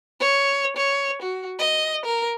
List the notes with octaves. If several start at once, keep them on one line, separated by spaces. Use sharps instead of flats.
C#5
C#5
F#4
D#5
A#4